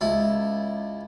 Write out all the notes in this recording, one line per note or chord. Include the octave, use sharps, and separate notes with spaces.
C#2 E4